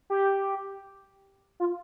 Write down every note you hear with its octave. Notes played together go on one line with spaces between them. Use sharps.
G4
F4